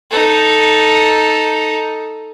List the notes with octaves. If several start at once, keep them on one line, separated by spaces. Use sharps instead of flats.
D#4 A4